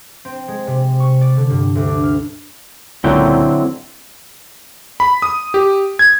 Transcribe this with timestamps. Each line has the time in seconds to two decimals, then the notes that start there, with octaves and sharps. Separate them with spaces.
0.25 C4
0.48 G#3
0.67 C3
1.00 C#6
1.21 D5
1.36 D3
1.50 G2
1.75 D2
1.87 D4
2.03 F6
3.04 C#2 A#2 D3 F#3 C4 E4 G5
5.00 B5
5.22 D#6
5.54 G4
5.99 G#6